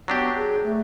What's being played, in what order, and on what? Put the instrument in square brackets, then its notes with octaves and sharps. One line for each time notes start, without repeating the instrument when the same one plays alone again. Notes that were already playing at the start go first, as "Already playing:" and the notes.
[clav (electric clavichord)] F#3 D4 G4 [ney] B3
[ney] G#4
A3